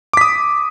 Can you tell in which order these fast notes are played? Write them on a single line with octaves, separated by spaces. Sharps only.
D6 B6 D#6